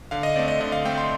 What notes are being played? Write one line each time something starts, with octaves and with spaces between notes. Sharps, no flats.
D3 F5
D#5
A3 C4 D5
D#5
D3 D#5
F5
A3 C4 G5
C6